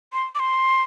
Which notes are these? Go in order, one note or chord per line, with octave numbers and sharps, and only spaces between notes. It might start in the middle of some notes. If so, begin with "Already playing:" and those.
C6
D6
C6